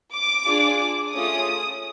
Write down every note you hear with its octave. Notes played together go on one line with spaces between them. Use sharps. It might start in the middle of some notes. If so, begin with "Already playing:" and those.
D6
D4 F4 G#4
A3 C#4 F4 G#4 D#6